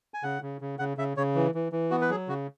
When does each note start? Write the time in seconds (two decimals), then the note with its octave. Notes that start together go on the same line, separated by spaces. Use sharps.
0.14 G#5
0.23 C#3 F#5
0.42 C#3
0.61 C#3
0.79 C#3 F#5
0.97 C#3 E5
1.17 C#3 C#5
1.35 E3
1.55 E3
1.72 E3
1.91 B3 F#4
2.01 B4
2.10 F#3 G#4
2.28 C#3 F#4